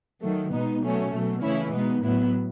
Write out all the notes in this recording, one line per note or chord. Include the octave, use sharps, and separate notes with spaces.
D#3 F#3 A3
B2 G#3 B3 D#4
B2 F#3 A3 C#4
B2 F#3 A3
C#3 E3 A3 C#4 E4
B2 G#3 B3 D#4
A2 F#3 B3 E4